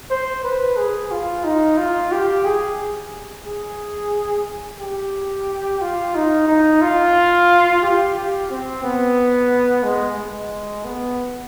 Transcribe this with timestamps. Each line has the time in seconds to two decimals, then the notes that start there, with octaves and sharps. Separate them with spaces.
0.10 C5
0.44 B4
0.77 G#4
1.11 F4
1.44 D#4
1.77 F4
2.12 G4
2.45 G#4
3.46 G#4
4.79 G4
5.81 F4
6.15 D#4
6.48 D#4
6.82 F4
7.83 G4
8.16 G4
8.50 C4
8.83 B3
9.83 G#3
10.17 G#3
10.85 B3